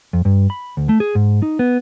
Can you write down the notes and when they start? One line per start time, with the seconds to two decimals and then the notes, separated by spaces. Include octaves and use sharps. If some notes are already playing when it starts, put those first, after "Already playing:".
0.13 F2
0.25 G2
0.50 B5
0.77 D2
0.89 A3
1.00 G#4
1.15 G#2
1.42 D#4
1.59 B3